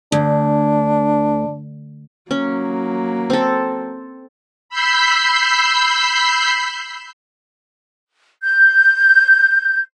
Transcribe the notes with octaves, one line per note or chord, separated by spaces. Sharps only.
D2 D4
F#3 A#3 C#4
C4 A4
B5 E6 G6 B6 C7
G6